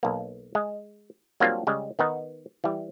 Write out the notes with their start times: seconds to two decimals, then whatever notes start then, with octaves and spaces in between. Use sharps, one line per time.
0.03 B1 A#3
0.55 G#3
1.40 F#3 G3 A#3 C4 D4 F4
1.67 C#3 G3 G#3
1.99 D#3 B3 D#4
2.64 E3 G3